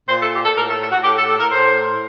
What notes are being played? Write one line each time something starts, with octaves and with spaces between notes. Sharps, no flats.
A#2 C5
A4
G4
A4
A2 A#4
A4
A4
F#4
A2 G4
A4
A4
A#4
A2 C5